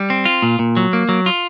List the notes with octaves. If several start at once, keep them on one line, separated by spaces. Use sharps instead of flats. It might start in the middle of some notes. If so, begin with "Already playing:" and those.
Already playing: G3
C4
F4
A#2
A#2
F#3
A#3
F#3
F4